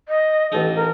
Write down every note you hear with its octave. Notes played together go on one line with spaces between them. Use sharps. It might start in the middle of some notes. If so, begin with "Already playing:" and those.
D#5
A1 D#4 A4
A#4